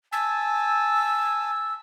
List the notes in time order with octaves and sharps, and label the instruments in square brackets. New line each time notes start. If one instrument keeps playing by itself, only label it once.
[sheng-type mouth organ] G#5 A5 [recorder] E6